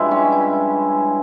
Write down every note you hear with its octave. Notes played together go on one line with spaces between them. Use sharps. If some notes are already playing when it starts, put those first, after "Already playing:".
Already playing: G2 F3 G#3 E4
C#4
E4